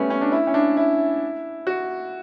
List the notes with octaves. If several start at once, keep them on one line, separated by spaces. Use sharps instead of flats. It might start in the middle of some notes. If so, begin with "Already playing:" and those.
Already playing: G3 A3 B3 C#4
C#4
D4
E4
C#4
D4
E4
F#4